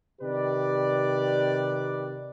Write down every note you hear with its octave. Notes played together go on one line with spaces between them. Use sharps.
C3 D#3 G4 B4 D5